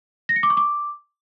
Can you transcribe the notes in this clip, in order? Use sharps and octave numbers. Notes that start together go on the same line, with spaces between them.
A#6
C#7
D6
C#6
D6